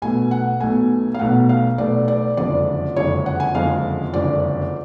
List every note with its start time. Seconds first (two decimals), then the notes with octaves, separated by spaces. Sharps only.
0.02 B1 B2 A3 G#5
0.31 F#5
0.60 B1 B2 A3 G#5
1.14 F5
1.19 B1 B2 A3 F#5
1.49 F5
1.78 B1 B2 A3 D5
2.08 D5
2.37 F#1 F2 D3 G#3 D5
2.96 F#1 F2 D3 G#3 C#5
3.26 F#5
3.40 G#5
3.55 F#1 F2 D3 G#3 F5
4.14 F#1 F2 D3 G#3 D5